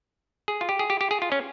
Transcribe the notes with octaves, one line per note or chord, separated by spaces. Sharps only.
G#4
F4
G4
G#4
G4
G4
G#4
F4
C#4